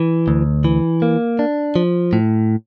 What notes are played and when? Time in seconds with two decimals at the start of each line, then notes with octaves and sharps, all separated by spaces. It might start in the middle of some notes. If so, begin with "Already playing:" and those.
Already playing: E3
0.28 D2
0.65 E3
1.02 A#3
1.39 D4
1.76 F3
2.13 A2